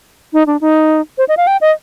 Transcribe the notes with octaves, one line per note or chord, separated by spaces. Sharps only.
D#4
D4
D#4
C5
D#5
F5
G5
D#5